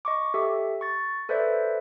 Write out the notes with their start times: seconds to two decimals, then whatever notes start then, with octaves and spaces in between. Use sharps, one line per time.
0.05 D#5 C#6 D6
0.34 G4 A4 E5
0.81 C#6 A6
1.29 A4 B4 C5 D5 E5